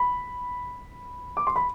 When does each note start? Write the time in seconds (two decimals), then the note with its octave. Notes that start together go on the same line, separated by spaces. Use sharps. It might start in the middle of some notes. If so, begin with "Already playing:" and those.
Already playing: B5
1.37 D6
1.47 C6
1.56 B5